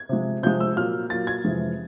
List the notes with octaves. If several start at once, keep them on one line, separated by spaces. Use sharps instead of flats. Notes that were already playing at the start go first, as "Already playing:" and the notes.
Already playing: G#6
C3 F3 G#3
C3 F3 G#3 G6
E6
A#2 F#3 A#3 F6
A#2 F#3 A#3 A6
G#6
F2 C3 E3 G#3